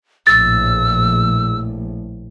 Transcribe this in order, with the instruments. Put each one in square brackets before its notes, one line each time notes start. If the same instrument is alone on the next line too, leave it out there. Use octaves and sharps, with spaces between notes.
[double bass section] A#1 A2 [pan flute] E6 [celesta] A6